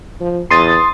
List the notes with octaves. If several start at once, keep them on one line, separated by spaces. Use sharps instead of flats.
F3
E2 C6 D#6 A6